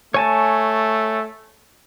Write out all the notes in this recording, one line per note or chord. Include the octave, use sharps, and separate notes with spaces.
A3 C#5 G#5 A5